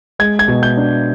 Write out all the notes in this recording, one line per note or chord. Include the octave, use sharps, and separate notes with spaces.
G#3 G#6
G#6
B2
G6
D4